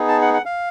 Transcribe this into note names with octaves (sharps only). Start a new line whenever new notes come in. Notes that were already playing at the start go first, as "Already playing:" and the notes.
Already playing: B3 D#4 G#4
A5
F#5
F#5
F5